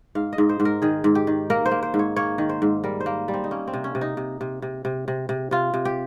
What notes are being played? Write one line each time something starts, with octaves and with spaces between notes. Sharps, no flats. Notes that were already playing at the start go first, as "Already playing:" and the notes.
G#2 F5
D#5
G#2
C5
G#2
A#4
D#3 G#4
G#2
G4
D#3
A#3 A#4
C5
A#3
C5
G#2
C#5
A#3 C#5
D#3
C5
G#2
G3 A#4
C5
A#3
G3
C4
D#4
A#3 C#4
C4
C3
C#4
C3
D#4
C3
C3
C3
C3
C3
C3
C3 F4
C3
G4